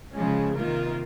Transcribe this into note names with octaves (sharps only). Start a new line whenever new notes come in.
C#3 F3 G#3 C#4
C3 D#3 A#3 F4 A#4